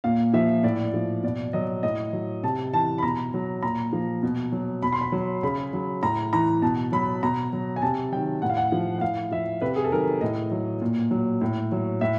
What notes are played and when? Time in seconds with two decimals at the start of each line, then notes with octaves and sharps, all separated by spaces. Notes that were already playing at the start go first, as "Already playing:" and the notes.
0.04 A#2 F5
0.33 F3 E5
0.63 A2 D5
0.94 F3
1.23 B2 D5
1.53 F#3 D#5
1.83 A2 D#5
2.13 F#3
2.43 C3 A5
2.73 E3 A5
2.98 B5
3.03 B2 A#5
3.34 F#3
3.63 A#2 A#5
3.93 F3
4.23 B2
4.52 F#3
4.83 B2 B5
4.93 C6
5.01 B5
5.12 F#3
5.43 C#3 B5
5.73 F#3
6.03 A2 A#5
6.33 E3 A#5
6.62 B2 A5
6.92 F#3 B5
7.23 B2 A#5
7.53 F#3
7.76 G#5
7.82 C3 A5
8.12 D#3 F#3 G5
8.42 A2 F#5
8.50 F5
8.57 F#5
8.72 F3
8.98 F#5
9.01 A2 F5
9.31 F3 E5
9.61 C3 B4
9.76 G#4
9.84 A4
9.91 D#3 F#3 A#4
10.21 A2 D#5
10.51 F#3
10.82 A#2
11.11 F#3
11.41 A2
11.72 F#3
12.01 A2 E5